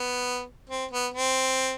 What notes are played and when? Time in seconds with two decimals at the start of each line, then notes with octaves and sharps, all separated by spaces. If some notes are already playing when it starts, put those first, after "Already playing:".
Already playing: B3
0.70 C4
0.92 B3
1.14 C4